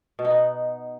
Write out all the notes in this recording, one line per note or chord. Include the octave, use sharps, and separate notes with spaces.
B2
D#4
B3